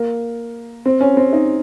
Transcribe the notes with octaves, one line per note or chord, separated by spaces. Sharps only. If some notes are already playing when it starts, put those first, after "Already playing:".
Already playing: A#3
C4
C#4
C4
D#4